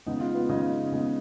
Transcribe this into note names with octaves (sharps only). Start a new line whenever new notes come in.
C#3 G#3 B3 D#4
F4
B3 B4
C#3 G#3 B3 D#4 D#5
C#3 G#3 B3